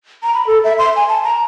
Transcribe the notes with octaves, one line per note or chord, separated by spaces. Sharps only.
A#5
B5
A4
E5
C6
G#5
A5
A#5